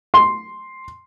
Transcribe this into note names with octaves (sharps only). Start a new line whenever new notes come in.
C6